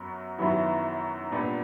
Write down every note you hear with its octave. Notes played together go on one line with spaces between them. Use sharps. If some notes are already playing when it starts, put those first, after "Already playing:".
Already playing: F#2 F#3 B3
F#2 D#3 F#3 B3 E4
A#2 G3 B3 D4